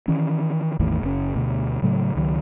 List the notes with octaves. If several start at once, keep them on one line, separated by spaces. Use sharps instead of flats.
D#3 E3 C#4
A1 E2 A2 D#3
F#1 C#4
D2 B2
A2 C#3 F#3 A3
C#2 D#3 F#3